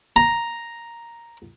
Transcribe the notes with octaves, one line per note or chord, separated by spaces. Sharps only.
A#5